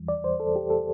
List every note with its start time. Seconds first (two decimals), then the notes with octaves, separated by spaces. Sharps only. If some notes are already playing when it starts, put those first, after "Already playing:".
Already playing: E2 E3 G3
0.08 D5
0.24 C5
0.40 A4
0.56 G4
0.70 A4